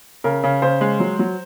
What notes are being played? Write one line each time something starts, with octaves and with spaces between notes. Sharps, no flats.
C#3 A#4
C#3
C#3 C5
G#3
F#3
F#3